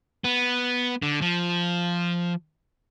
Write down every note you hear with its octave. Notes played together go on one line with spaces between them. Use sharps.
B3
D3
F3